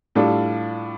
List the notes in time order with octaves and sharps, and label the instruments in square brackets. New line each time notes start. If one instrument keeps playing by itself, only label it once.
[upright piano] A2 G3 D4 F4 A4